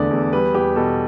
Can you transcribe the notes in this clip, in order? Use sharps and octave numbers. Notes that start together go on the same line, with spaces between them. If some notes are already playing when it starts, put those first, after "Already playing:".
Already playing: E2 D3 A3 D5
E2
G3 B4
E2 G4
B2 A4